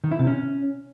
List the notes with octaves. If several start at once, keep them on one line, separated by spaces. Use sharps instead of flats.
D#3
E4
C3
C#4